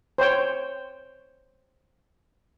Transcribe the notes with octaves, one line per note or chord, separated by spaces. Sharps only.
C5 C#5 G5